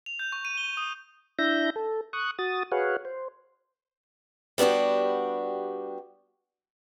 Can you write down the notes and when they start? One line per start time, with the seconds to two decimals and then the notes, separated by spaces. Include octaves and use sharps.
0.06 F7
0.19 G6
0.32 C#6
0.45 D#7
0.57 G7
0.77 D#6
1.39 D4 E4 E5 G6 A#6
1.76 A4
2.13 C#6 D#6 F#6
2.39 F#4 D#6 A6
2.72 F#4 G#4 B4 C#5 F5 F#5
3.05 C5
4.58 G3 B3 D4 F#4 G4